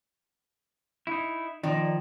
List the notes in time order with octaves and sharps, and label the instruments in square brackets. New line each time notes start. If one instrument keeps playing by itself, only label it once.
[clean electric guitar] D#4 E4
[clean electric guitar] D#3 F3 [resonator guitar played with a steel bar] A#3 D#4 D5